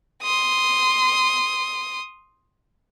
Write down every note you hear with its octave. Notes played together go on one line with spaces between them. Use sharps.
C6 D#6